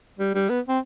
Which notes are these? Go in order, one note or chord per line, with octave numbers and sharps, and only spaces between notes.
G3
G3
B3
C4